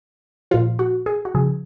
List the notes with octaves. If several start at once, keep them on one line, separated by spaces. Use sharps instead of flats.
A#2 F3 F4
F#4
G#4
F#4
C#3 F3 G#4